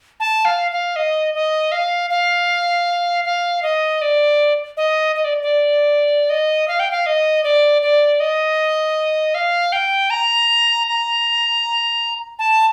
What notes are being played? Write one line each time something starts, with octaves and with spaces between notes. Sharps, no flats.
A5
F5
F5
D#5
D#5
F5
F5
F5
D#5
D5
D#5
D#5
D5
D5
D#5
F5
G5
F5
D#5
D5
D5
D#5
F5
G5
A#5
A#5
A5